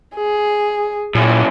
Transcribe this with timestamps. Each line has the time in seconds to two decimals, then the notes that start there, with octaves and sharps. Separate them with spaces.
0.15 G#4
1.15 F#2 A#2 E4